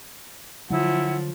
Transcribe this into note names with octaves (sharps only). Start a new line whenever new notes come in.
D3 F3 F#3 E4 G#4 F#5